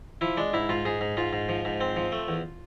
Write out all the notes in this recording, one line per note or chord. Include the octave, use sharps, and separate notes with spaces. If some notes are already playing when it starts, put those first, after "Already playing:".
F3 E4
G#3 D4
G#2 E4
G#2 F4
G#2 G#4
G#2
G#2 F4
G#2
F3
G#2
C4
F3
A3
E2